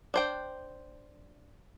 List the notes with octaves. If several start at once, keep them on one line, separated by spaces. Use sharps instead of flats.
D4 C5 G5